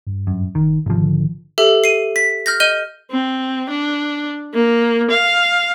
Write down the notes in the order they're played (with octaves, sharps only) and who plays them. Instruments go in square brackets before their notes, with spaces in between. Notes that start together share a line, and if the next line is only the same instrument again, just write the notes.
[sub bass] G2
[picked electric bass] F#2
[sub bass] F#1 [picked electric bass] D#3
[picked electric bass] G#1 F3 [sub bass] C3
[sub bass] D3
[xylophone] G4 A4 E5
C7 D#7
B6
F6 G6 A#6
D#5 F6 G6 D#7 G7
[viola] C4
D4
A#3
F5